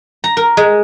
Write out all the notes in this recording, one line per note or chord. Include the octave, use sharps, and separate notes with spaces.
A#5
A#4
G#3